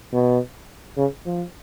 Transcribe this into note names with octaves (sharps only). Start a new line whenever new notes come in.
B2
C#3
F3